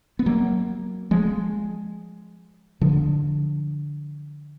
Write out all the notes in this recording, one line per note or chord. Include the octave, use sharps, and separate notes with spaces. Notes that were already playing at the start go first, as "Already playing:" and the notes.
B3
F#3 A#3
F3 G#3
D3 F3